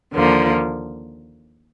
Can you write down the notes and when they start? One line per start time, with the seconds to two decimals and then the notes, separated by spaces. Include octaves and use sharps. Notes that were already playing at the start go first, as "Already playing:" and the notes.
0.13 D#2 D3 F3 A#3